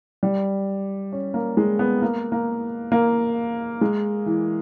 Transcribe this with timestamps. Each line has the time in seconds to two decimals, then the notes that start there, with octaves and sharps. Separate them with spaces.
0.23 G3
1.12 C#4
1.34 A#3
1.57 G#3
1.79 B3
2.02 A#3
2.32 A#3
2.92 A#3
3.81 G#3
4.26 E3